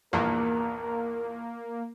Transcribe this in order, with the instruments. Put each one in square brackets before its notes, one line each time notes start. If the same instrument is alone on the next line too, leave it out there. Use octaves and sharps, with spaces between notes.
[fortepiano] A#1 E2 G2 [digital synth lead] A#3 [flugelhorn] A#4